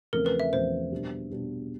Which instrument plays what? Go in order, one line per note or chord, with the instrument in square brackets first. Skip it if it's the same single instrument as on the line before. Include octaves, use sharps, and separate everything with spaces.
[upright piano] E2 C#3 F3 A3 C4 [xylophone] A#4
[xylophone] B4
E5
[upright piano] E2 C#3 F3 A3 C4 [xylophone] C5
[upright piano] B2 G3 B3 D4
B2 G3 B3 D4